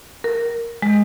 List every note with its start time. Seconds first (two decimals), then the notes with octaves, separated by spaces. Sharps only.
0.24 A#4
0.82 G#3